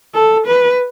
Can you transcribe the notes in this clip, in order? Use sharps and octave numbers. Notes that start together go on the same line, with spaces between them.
A4
B4